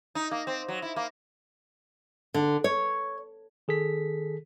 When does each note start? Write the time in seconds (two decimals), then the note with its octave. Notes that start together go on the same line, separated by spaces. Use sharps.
0.15 D#4
0.31 A#3
0.47 C4
0.68 F#3
0.82 E4
0.96 A#3
2.34 D3
2.64 C#5
3.68 D#3 G#4 A4 B6